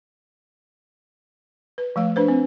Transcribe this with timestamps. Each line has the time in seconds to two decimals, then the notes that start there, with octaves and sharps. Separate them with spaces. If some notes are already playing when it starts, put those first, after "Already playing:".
1.78 B4
1.96 F3 A3 F5
2.16 D4 B4 C5
2.28 C4